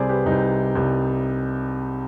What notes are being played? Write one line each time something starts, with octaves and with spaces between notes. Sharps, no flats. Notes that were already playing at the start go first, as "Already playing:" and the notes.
Already playing: C2 C3 G3 G#4 C5 D5
G4 B4
C2 C3 G3 D#4
C2 C3 G3